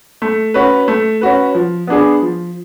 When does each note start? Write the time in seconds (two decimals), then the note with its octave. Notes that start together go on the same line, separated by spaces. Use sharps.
0.22 A3
0.54 C#4 F#4 B4
0.88 A3
1.21 C#4 F#4 B4
1.55 F3
1.87 B3 D4 G#4
2.22 F3